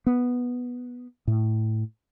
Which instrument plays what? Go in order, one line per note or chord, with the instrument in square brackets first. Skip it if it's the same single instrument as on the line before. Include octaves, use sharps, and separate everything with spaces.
[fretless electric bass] B3
A2